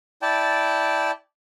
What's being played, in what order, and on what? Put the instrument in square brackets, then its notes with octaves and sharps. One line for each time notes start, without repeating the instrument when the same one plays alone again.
[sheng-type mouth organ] E4 D5 G5 A5